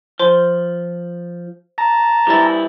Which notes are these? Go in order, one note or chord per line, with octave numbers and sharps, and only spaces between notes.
F3 C5 C6
A5 A#5
E3 G3 E4 G4 A6